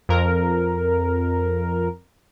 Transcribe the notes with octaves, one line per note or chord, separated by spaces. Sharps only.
F2 A#4